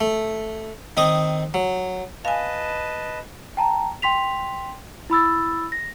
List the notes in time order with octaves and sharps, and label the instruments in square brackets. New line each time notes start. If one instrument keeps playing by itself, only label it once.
[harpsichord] A3
D#3 C4 D#5 D#6
F#3
[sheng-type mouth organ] B4 D#5 A5 [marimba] F5 G#5
[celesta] G5 A5 A#5
G5 C6 B6 F7
E4 B5 E6 A6
A#6